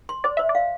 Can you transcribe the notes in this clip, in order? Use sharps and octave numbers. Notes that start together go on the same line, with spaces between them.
C6
C5 D5
C5 E5
D5
F5